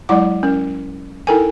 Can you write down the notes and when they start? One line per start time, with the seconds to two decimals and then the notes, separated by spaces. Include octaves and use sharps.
0.09 F#3 G#3 E4 D5 F#5 D6
0.43 C#4 A#4
1.27 D#4 E4 A4 A#4 G5 G#5